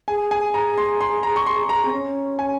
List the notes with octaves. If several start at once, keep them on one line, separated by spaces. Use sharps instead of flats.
G#4 G#5
G#5
A#5
C6
C6
A#5
C#6
C6
A#5
C4
C#4
G#5